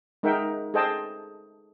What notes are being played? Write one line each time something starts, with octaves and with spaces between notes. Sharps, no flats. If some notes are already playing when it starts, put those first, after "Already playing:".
G#3 D#4 A#4 E5 F#5 G5
G#4 A4 C5 D#5 G5 A5